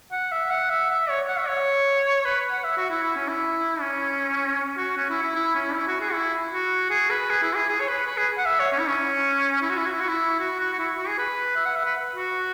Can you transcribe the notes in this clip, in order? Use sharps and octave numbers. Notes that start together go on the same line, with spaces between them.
F#5
E5
F#5
E5
E5
C#5
F#5
E5
C#5
B4
F#5
E5
F#4
E4
E4
C#4
E4
C#4
F#4
C#4
E4
E4
E4
C#4
E4
F#4
G#4
E4
F#4
G#4
B4
G#4
E4
G#4
G#4
C#5
B4
B4
G#4
F#5
E5
C#5
C#4
E4
C#4
E4
F#4
E4
F#4
E4
F#4
E4
F#4
F#4
F#4
E4
F#4
G#4
B4
E5
F#5
E5
B4
F#4